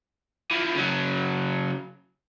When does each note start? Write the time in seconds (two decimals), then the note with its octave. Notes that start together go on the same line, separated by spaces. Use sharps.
0.51 E3 F3
0.75 C#3 F#3